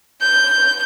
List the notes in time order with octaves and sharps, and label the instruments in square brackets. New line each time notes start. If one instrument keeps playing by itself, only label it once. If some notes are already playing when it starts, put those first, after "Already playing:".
[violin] G6